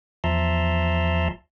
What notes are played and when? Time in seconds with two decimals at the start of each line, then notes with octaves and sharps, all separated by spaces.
0.24 E2 F3 E5 A5 A#5 C6